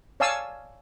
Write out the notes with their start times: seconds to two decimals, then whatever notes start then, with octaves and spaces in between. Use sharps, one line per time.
0.20 C#5 D5 F5 G#5 A5 E6